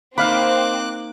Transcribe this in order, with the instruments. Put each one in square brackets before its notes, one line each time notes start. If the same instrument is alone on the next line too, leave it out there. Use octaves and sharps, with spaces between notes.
[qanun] A#3 D#4 [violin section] C4 [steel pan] F5 B5 [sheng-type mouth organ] D6 F#6